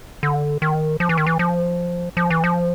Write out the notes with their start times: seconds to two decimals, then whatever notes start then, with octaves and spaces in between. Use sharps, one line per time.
0.23 D3
0.62 D#3
1.00 F3
1.09 E3
1.18 D#3
1.26 E3
1.39 F3
2.17 F3
2.30 E3
2.44 F3